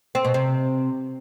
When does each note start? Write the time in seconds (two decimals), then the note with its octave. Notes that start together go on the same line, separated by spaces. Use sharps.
0.15 C4
0.25 B2
0.34 C3